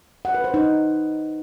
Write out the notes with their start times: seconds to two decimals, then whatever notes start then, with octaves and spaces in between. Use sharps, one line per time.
0.25 F#5
0.34 B4
0.44 C5
0.54 D#4